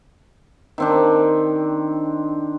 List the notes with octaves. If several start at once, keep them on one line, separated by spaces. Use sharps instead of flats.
D#3 C4 D4